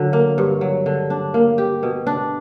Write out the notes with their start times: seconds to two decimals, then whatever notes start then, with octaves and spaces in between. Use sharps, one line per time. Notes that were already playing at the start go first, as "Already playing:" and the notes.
Already playing: D3 F#3
0.13 A#3
0.38 G2
0.61 F#3
0.86 D3
1.10 D4
1.34 A#3
1.58 G4
1.83 B2
2.07 D4